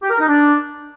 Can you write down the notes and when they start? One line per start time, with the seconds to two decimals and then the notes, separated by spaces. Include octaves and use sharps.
0.02 G4
0.10 A#4
0.19 D#4
0.27 D4